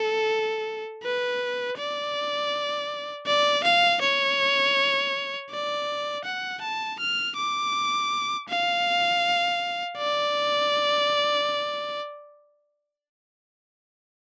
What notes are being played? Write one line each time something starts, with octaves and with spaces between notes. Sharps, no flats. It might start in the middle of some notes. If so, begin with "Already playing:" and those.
Already playing: A4
B4
D5
D5
F5
C#5
D5
F#5
A5
F6
D6
F5
D5